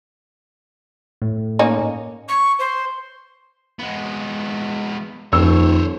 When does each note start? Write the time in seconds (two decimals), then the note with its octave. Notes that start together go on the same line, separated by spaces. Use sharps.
1.22 A2
1.59 A#3 C#4 D#4
2.28 C#6
2.59 C5
3.79 G#3 B3
5.33 D#1 F2 C5 C#5 E6